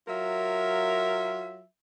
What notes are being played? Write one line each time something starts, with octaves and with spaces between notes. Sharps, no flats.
F#3 F4 A#4 E5